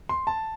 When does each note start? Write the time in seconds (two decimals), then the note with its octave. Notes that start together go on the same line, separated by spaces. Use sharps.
0.09 C6
0.27 A5